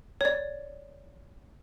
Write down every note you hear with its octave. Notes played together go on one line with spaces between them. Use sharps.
C#5 D5